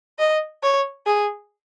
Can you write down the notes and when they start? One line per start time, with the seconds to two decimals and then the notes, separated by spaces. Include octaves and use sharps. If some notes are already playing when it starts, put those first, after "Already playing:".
0.19 D#5
0.63 C#5
1.06 G#4